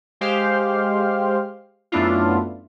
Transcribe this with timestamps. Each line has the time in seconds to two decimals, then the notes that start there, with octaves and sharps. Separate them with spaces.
0.21 G#3 G4 C5 F5
1.92 F#2 A3 B3 D4 E4 F4